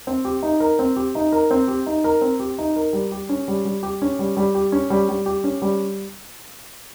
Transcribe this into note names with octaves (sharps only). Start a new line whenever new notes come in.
C4
G4
D#4
A#4
C4
G4
D#4
A#4
C4
G4
D#4
A#4
C4
G4
D#4
A#4
G3
G4
C#4
G3
G3
G4
C#4
G3
G3
G4
C#4
G3
G3
G4
C#4
G3